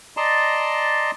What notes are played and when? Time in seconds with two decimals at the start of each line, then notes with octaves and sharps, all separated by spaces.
0.17 D5 D#5 A5 A#5 C6